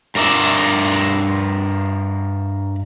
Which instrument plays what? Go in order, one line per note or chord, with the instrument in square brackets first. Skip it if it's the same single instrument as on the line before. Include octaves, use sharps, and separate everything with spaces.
[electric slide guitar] G2 A#4 D5 E5